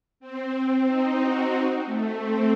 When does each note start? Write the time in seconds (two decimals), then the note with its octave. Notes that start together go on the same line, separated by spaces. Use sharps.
0.20 C4
0.86 D#4
1.20 F#4
1.86 A3
2.20 C4